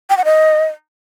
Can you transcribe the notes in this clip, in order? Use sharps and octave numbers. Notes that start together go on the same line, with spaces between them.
G5
F#5
D#5